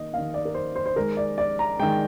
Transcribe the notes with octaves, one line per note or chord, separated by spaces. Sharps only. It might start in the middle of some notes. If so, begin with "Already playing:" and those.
Already playing: D#3 A#3 D#5
D#3 A#3 F5
D5
A#4
C5
C5
C5
D#3 G#3 A#4
D5
D5
A#5
D#3 G#3 G5